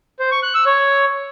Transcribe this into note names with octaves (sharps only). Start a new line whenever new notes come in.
C5
C#6
F#6
E6
C#5